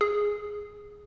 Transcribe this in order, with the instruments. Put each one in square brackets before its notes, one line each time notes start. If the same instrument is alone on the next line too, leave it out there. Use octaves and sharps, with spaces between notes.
[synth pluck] G#4